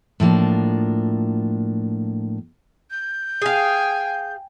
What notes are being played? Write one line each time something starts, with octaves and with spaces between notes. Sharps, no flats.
A2 F3 A#3 D4
G6
G#4 F5 G5 G#5